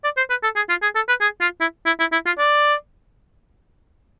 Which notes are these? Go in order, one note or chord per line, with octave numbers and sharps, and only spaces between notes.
D5
C5
B4
A4
G#4
F4
G#4
A4
B4
G#4
F4
E4
E4
E4
E4
F4
D5